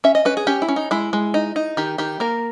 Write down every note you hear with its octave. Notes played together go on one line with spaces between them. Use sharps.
C#4 E5
D#5
C#4 B4
G#4
C#4 G4
E4
C#4
D#4
G#3 E4
G#3
D#4
D#4
D#3 G4
D#3 G4
A#3 A#4